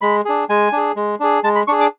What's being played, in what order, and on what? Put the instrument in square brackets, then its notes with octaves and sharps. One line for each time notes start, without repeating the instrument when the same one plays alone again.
[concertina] G#3 B5
D4 G#4
G#3 G#5
D4 G#4
G#3
D4 G#4
G#3 A5
B5
D4 G#4 C#6
D6